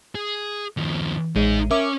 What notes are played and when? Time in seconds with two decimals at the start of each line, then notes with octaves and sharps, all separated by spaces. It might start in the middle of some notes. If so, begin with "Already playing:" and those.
0.15 G#4
0.77 D#2 F3
1.36 A1 G#3 D#4 G#4
1.71 C#4 A#4 E5 D6